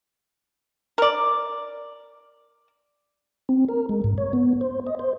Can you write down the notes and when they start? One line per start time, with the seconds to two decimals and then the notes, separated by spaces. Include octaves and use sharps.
0.98 A#4 D5
3.49 C4
3.69 A#4
3.89 G#3
4.04 G#2
4.18 C#5
4.33 B3
4.61 C5
4.87 D#5
4.99 C5